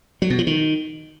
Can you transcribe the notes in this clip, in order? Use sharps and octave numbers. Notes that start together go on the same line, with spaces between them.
F#3
B2
F3
D#3